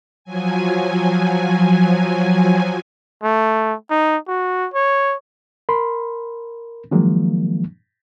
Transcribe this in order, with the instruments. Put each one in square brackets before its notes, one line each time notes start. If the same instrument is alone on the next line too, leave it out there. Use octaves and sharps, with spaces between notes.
[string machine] F3 F#3 G#5
[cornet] A3
D#4
F#4
C#5
[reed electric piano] A#4 B5 C6
D#3 F3 F#3 G#3 A#3